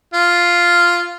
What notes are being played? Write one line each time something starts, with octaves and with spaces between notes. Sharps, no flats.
F4